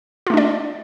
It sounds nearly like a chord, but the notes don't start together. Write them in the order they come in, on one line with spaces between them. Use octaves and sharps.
F4 A3 D4 D5